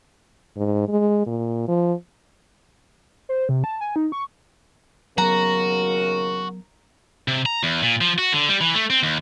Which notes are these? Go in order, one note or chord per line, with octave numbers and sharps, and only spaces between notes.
G#2
G#3
A#2
F3
C5
C3
A5
G#5
D#4
C#6
D#2 C#3 F#3 B3 F#4 A#4 A#5
C3
A#5
E2
A#2
F3
F#4
D3
G3
E3
A3
C4
D#2